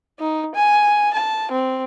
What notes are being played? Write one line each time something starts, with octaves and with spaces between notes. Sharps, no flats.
D#4
G#5
A5
C4